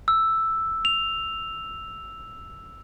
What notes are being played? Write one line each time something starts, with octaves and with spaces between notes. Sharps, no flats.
E6
F7